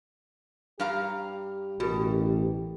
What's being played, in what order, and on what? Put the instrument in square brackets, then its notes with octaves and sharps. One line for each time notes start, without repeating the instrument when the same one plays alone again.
[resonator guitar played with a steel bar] G2 F5 A#5 [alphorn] G4
[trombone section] A1 [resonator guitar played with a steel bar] B2 [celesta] F#4 A#4